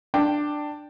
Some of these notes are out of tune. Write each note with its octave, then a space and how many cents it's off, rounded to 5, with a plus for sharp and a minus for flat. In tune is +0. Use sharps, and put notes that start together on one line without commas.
D4 +10 G5 +0